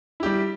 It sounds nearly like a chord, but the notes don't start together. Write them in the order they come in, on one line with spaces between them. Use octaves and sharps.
E4 G4 G3